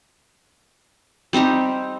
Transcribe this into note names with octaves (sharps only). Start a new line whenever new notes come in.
G3 C4 D#4 G4